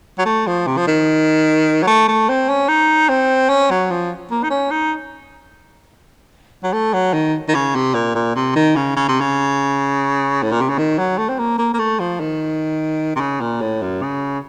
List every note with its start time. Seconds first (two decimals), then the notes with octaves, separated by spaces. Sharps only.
0.18 F#3
0.25 A3
0.47 F3
0.67 C3
0.77 F3
0.87 D#3
1.83 F#3
1.87 A3
2.08 A3
2.29 C4
2.49 C#4
2.68 D#4
3.09 C4
3.49 C#4
3.70 F#3
3.91 F3
4.31 A#3
4.43 D#4
4.50 C#4
4.71 D#4
6.63 F#3
6.73 A3
6.93 F#3
7.13 D#3
7.48 D#3
7.54 C#3
7.75 C3
7.94 A#2
8.15 A#2
8.36 C3
8.55 D#3
8.76 C#3
8.96 C#3
9.08 C3
9.20 C#3
10.43 A2
10.51 A#2
10.61 C3
10.69 C#3
10.78 D#3
10.98 F#3
11.18 A3
11.29 C4
11.39 A#3
11.58 A#3
11.74 A#3
11.79 A3
11.99 F3
12.20 D#3
13.15 C3
13.20 C#3
13.41 A#2
13.61 A2
13.82 F#2
14.02 C#3